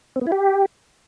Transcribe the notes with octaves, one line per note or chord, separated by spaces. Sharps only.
C4
B3
E4
G4